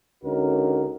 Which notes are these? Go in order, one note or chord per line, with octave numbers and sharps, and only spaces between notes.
C#2 D3 C#4 D#4 F#4 A#4